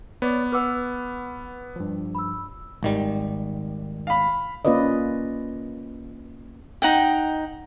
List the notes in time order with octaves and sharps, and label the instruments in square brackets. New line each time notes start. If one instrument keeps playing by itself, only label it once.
[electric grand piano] B3 [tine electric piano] C#5 D5 D6
[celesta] B4 D6 E6 [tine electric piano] F#5 F6
[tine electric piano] G2 F3
[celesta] B5 E6
[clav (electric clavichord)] G#1 D#3 G3
[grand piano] F5 B5
[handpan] A#3 C#4 F4 B4 D5 D#5
[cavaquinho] D#4 F#5 G5